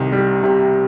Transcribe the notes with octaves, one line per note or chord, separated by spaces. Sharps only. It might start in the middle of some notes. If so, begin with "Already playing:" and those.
Already playing: C2 C3 D#3
G3
C3